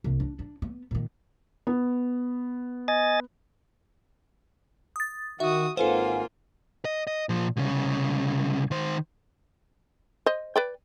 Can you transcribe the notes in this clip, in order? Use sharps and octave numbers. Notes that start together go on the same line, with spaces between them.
C2
D4
D4
B3
A#2 D#3
B3
D#5 G#5 A6
D#6 A6
D#3 F#4 E5 D#6
G#1 A#3 F4 A4 B4 C5 F#5 G#5
D#5
D#5
A#2 F3
C2 C#3
D#3 C5
C5 D#5
B4 D5 G5